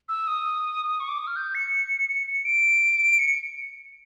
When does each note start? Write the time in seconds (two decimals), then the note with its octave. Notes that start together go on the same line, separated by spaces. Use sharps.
0.09 E6
0.27 D#6
1.00 C#6
1.09 D6
1.18 D#6
1.27 F6
1.36 G6
1.55 C#7
2.09 C#7
2.27 C#7
2.45 D7
3.19 C#7